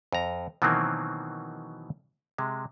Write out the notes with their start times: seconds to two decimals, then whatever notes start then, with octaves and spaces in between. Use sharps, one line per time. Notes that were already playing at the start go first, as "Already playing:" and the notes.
0.12 F2 A#5
0.62 B2 D#3 E3 F#3 A#3 C4
2.38 C3 G#3